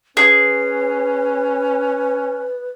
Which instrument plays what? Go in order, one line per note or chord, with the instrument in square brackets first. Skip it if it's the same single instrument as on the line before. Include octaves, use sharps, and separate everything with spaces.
[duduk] C#4 [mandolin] G#4 [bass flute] B4